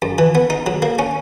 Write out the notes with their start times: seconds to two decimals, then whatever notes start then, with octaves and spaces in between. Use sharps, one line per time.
0.02 F#2
0.18 E3
0.35 B3
0.50 D#4
0.66 F#3
0.82 A#3
0.99 C#4